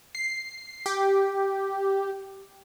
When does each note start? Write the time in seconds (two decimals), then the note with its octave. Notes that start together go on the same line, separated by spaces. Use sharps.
0.15 C7
0.86 G4